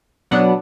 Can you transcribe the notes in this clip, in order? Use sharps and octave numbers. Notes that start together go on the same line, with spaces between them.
B2 F#3 B3 D4 F#5